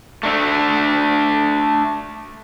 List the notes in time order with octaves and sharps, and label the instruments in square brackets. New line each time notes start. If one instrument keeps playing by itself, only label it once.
[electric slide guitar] A3 D4 A4